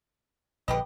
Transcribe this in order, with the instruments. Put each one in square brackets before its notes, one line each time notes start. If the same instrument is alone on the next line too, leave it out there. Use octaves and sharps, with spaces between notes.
[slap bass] A#1 D3 [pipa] G4 B4 D#5